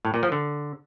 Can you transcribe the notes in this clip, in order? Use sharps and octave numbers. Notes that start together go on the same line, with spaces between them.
A2
A#2
F3
D3